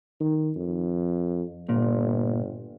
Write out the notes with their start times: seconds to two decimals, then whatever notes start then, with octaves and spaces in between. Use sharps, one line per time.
0.20 D#3
0.56 F2
1.69 G1 A#2